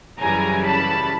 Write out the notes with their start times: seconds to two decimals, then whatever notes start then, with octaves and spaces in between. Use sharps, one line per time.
0.20 F#2 C#3 E3 G3 G#5 A#5
0.65 A5 B5